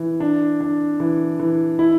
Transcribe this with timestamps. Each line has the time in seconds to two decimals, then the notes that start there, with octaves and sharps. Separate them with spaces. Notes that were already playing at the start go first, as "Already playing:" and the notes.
Already playing: E3
0.20 D4
0.60 D4
1.00 E3
1.40 E3
1.79 E4